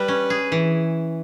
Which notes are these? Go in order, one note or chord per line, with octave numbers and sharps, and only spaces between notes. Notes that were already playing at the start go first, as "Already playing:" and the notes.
Already playing: G3 B4
C#4
G#4
E3